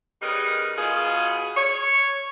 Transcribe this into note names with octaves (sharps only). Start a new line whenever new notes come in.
C#3 G3 B3 D#4 G#4 A#4
B2 B3 F4 G#4
C#5